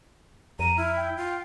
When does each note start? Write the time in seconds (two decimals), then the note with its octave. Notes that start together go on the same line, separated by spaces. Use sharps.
0.59 F2 A#5 D#7
0.77 E4 F6
0.96 G5
1.17 F4